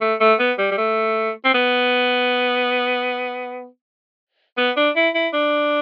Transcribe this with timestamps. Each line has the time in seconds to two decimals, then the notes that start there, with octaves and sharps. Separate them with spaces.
0.01 A3
0.21 A3
0.39 B3
0.58 G3
0.72 G3
0.77 A3
1.45 C4
1.54 B3
4.57 B3
4.76 D4
4.95 E4
5.15 E4
5.33 D4